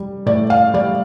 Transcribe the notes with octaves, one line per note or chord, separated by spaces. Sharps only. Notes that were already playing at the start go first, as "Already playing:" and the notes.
Already playing: G3
A2 D5
F5
G3 D5